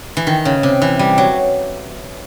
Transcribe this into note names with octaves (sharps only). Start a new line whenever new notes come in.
E3
D#3
C#3
C3
E3
G3
F#3